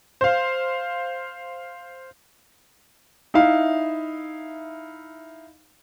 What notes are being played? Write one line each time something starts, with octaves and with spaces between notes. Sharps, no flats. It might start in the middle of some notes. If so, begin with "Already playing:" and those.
C5 F5
D#4 E4 E5 F5